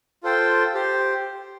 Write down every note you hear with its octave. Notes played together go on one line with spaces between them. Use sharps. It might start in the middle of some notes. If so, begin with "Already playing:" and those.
F4 A4 C5 G5
G4 C5